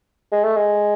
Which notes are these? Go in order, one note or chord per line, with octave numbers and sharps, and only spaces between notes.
G#3
A3
G#3